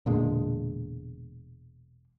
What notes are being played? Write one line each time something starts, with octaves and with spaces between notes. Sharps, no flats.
E1 A#2 D3 G#3